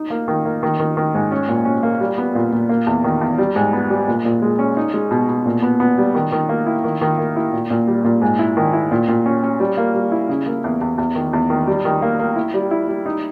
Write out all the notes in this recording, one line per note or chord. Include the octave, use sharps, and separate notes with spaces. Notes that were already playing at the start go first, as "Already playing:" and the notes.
Already playing: D#4
A#3
D#3
A#3
D#3
D#3
D#3
G#2
C#4
A#2
C#4
A#3
G3
B3
A#2
A#2
A#3
E2
D#3
E2
G3
G#2
B3
G3
A#2
A#2
G#3
C#4
D#4
G#3
B2
B2
A#2
B3
B3
G3
D#3
D#3
A#3
E4
D#3
D#3
A#3
E4
A#2
A#2
G3
A#2
G#2
E4
D#3
E4
A#2
A#2
C#4
C#4
G3
A#3
G3
E4
C#3
A#3
E2
E2
E2
D#3
E2
D#3
G3
D#3
A#3
A#3
E4
G3
E4
G3
D#4